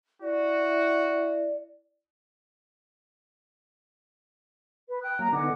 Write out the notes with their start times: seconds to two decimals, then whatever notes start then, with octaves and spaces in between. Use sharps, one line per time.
0.22 E4 F#4 D5
4.88 B4
5.01 G5 D#6 F#6
5.19 F#3 A#3 A#5
5.33 D3 B3 D#4 F#5 G#5 D6